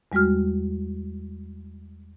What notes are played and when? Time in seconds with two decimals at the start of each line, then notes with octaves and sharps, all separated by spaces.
0.12 E2 G3 G#3 F#4 F6